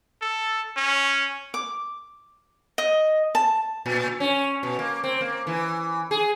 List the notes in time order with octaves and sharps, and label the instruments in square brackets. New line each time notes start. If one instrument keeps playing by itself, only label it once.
[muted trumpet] A4
C#4
[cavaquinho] D6
D#5
A5
[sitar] A#2
C#4
B2
A#3
C4
A#3
E3
G#4